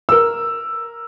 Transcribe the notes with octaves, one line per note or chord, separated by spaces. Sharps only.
A#4 E6